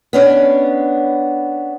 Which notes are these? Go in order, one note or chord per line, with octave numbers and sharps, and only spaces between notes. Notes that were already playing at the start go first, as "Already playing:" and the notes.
B3 C#4 D4